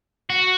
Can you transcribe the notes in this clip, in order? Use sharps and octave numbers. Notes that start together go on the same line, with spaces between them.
F#4